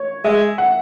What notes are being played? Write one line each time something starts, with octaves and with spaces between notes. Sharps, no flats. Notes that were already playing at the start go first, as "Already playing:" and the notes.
Already playing: C#5
G#3 E5
F#5